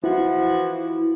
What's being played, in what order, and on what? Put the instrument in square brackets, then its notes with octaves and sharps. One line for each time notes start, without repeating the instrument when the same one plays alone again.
[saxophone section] E3 F3 F#4 [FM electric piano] E4